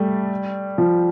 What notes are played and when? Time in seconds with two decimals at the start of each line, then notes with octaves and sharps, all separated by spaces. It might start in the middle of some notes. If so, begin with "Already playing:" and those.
Already playing: G3 A3
0.78 F3